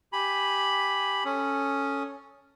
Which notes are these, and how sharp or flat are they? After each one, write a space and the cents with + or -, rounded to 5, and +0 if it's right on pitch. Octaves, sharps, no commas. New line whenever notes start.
G4 +0 G#5 +0 B5 +0
C#4 +0 A4 +0 D#6 +0